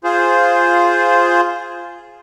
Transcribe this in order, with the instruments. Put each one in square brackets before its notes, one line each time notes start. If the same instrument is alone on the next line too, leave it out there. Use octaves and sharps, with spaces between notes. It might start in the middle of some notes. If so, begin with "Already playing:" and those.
[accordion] F4 G#4 C5